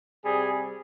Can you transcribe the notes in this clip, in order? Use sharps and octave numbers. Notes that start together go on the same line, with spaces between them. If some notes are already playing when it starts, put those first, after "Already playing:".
C3 G3 C4 G#4